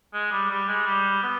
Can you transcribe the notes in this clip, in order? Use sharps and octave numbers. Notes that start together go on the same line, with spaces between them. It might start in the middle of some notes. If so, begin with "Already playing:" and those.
G#3
G3
G3
G#3
G3
B3